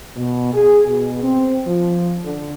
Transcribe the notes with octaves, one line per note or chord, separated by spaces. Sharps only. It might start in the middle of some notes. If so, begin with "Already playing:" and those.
B2
G#4
B2
C4
F3
D3